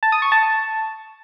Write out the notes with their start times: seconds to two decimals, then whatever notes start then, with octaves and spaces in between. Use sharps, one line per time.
0.03 A5
0.12 D#6
0.22 C#6
0.32 A5